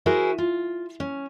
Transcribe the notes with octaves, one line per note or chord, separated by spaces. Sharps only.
E4 F#4 G#4 A#4 C5
F4
C#4